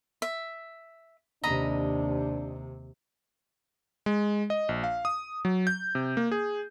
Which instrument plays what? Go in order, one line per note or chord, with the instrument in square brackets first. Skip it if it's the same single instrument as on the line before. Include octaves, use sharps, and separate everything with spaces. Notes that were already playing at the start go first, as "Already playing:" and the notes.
[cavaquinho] E5
[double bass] D#2 C3 [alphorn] D4 [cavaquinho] D#5 A#5 B5
[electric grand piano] G#3
D#5
A#1
F5
D#6
F#3
G6
C3
A#3
G#4